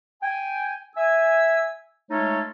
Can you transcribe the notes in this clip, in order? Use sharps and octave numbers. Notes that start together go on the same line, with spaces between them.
G5 G#5
E5 G#5 E6
G#3 A3 D#4 F4 A4 C#5